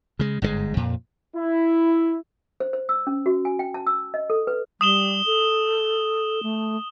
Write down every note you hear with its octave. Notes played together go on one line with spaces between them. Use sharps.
C#3 G#3
G1 G#2 C3 G#3
F2 A#2
E4
C5
C5
E6
C#4
F#4
G#5
G5
A5
E6
D#5
A4
B4
G3 D#6 E7 G7
A4
A3